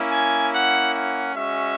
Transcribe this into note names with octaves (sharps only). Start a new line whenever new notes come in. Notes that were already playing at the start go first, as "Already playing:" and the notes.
Already playing: A#3 C#4 E4
G#5
F#5
F#5
G#3 C#4 F#4 E5